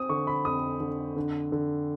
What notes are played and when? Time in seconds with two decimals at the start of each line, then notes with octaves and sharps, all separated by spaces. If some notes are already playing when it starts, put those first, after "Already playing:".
Already playing: C4 D#6
0.09 D3 C#6
0.27 B5
0.45 F2 D#6
0.80 D3
1.16 D3
1.52 D3